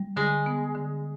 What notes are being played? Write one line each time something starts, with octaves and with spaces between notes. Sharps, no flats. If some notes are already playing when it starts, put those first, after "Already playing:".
Already playing: G3
D3 G#3
B3
D3